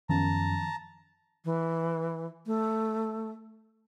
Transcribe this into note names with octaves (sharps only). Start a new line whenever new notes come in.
F#2 D#3 F3 B3 A5 A#5
E3
A3